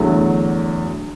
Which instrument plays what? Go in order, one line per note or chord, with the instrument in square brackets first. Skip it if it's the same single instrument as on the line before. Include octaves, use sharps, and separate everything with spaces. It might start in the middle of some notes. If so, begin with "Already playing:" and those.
Already playing: [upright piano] E2 D3 F#3 A3